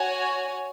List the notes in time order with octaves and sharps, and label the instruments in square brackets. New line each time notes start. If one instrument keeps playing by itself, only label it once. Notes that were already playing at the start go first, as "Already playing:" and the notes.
Already playing: [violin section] F#4 C#5 G#5